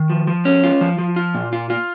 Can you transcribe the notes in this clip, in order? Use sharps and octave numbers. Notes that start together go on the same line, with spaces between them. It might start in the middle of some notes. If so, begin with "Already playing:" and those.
Already playing: D#3
F3
F3
C#4
F4
F3
F3
F4
A#2
F4
F4